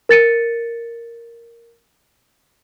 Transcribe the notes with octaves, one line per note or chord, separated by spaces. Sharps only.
A#4 A6 C#7 D#7